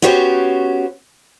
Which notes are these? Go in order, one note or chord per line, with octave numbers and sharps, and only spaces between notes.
B3 C#4 F#4 G4 C5 C#5